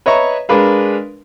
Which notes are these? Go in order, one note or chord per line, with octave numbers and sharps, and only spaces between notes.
B4 C#5 D#5 E5 A#5 C#6
G#3 D4 A#4 B4 F5